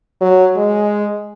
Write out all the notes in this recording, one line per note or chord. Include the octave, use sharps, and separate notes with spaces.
F#3
G#3